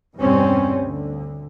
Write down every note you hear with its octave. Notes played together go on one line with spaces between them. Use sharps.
E2 G2 B2 G3 C4 C#4
D2 D3